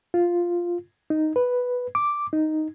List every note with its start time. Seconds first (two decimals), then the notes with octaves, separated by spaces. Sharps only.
0.14 F4
1.10 D#4
1.36 B4
1.95 D6
2.33 D#4